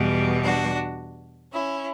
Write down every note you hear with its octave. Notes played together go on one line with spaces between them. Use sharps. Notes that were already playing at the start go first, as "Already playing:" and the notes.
Already playing: E2 B2 G3
D4 F#4
C#4 E4